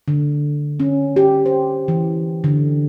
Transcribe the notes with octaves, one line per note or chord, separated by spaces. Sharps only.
D3
C#4
G4
C5
E3
D3